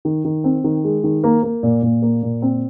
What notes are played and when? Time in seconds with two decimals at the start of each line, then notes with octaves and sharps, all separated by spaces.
0.05 D#3
0.25 D#3
0.44 C4
0.64 D#3
0.84 G#3
1.04 D#3
1.24 A#3
1.43 A#3
1.63 A#2
1.83 A#2
2.02 A#3
2.22 A#2
2.42 C4